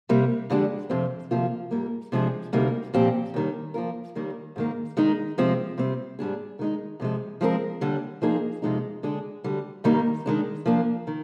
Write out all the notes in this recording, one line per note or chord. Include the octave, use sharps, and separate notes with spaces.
C3 G3 A#3
F2 D3 G#3 D4 G4
F2 C3 F3 C4
D2 C3 F3 A#3 F4
G#2 G3 A#3
C3 F3 G#3 D4 G#4
D2 C3 G3 A#3 D#4
A#2 F3 C4 G4
D#2 D#3 G3
F3 A#3 F4 A#4
D#2 D#3 G3 A#3
G#2 D#3 A#3
D#3 G#3 D#4
C3 F3 G#3 C4
C3 G3 C4
G#2 G3 D4 G#4
D#3 G#3 D#4
F2 C3 F3 G#3
F3 G#3 C4 G4 A#4
D#2 D3 G3
F3 A#3 D#4 G#4
F2 C3 F3 G#3 D#4
D3 G#3 D4 G#4
D2 D3 G3
G2 D#3 G3 A#3 D#4
D#3 G#3 D4
F3 A#3 D4
D#3